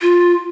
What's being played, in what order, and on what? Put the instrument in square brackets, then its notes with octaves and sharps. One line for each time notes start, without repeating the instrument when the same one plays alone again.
[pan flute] F4